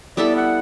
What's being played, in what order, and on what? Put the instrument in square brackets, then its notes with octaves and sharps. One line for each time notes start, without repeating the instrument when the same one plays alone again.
[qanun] G3 B3 E4 A4 [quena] D5
[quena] F#5